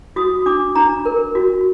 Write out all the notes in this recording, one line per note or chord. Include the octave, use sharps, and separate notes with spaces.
F#4 D#6
D4 D6
D4 A#5
A#4
F#4